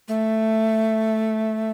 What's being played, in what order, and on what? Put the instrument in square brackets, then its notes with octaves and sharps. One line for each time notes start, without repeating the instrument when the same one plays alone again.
[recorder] A3